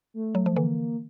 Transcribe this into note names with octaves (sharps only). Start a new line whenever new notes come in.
A3
F#3
F3
D3 E3 A#3